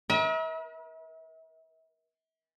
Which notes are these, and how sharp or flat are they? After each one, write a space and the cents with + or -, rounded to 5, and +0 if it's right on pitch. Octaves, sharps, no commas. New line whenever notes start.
A#4 +45 E5 -40